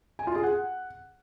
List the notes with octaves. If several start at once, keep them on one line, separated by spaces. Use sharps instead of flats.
G#5
F4
G#4
F#5